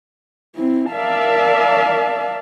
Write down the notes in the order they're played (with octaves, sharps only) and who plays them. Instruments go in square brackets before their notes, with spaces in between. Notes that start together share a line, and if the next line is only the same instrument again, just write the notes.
[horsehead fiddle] C4 E4
[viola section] A#4 D5 E5 [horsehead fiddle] F5 A5